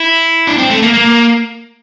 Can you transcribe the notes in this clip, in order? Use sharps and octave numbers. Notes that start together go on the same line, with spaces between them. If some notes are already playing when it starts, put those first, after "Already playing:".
Already playing: E4
D4
C4
A3
A#3
A#3